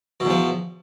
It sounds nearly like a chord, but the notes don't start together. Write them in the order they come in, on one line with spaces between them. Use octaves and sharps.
B2 E2 F3